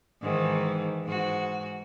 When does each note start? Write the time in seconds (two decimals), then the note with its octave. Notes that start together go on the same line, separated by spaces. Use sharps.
0.22 G#2 D#3 E3
1.05 G#2 F#4